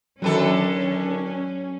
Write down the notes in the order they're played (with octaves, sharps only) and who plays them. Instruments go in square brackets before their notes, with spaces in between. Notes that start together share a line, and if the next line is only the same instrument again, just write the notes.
[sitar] D3 D#3 A4 [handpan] F#3 [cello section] C#4